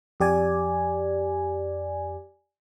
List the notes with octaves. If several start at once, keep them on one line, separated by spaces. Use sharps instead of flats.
F2 G4 D5 G#5